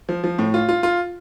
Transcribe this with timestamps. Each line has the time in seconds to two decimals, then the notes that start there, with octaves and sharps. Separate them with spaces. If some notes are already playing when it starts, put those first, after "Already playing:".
0.09 F3
0.24 F3
0.38 A2
0.54 F4
0.69 F4
0.83 F4